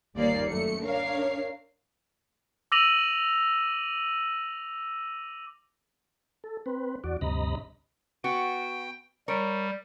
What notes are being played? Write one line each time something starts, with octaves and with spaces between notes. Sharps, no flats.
G1 D#2 A#3 D5 C7
F#2 A3 C#7
D4 A#4 C#5 F5 C7
D6 E6 A#6 D#7 F7 F#7
A4
C4 B4
E2 F#4 D5
D2 G2 C3 D#5 A#5 B5
B3 F#4 G5
G3 A#4 C#5